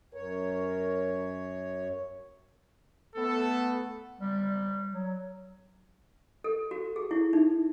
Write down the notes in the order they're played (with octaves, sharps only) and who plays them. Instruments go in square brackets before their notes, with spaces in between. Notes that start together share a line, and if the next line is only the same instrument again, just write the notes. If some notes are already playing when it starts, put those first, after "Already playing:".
[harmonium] F#2 C#5 [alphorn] A#4
[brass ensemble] A3 B3 A4
[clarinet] G3
F#3
[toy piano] A4
F#4
G#4
E4
D#4